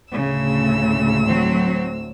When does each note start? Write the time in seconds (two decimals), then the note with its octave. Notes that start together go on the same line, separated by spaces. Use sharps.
0.13 D2 A2 C#3 E6
1.25 F#3 C4